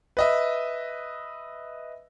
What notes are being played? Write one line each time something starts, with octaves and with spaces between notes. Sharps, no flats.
B4 D#5 E5